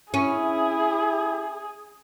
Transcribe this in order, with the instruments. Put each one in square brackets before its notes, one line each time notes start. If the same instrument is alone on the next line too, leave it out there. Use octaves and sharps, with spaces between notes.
[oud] C#4 [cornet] E4 [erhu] G#4